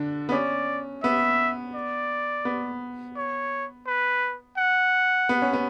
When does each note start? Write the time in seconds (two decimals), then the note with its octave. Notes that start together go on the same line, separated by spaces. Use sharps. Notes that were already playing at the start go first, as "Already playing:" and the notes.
Already playing: D3 D4
0.29 B3
0.32 C#4 D5
1.03 B3 E5
1.75 D5
2.45 B3
3.16 C#5
3.87 B4
4.58 F#5
5.29 B3
5.42 C#4
5.53 B3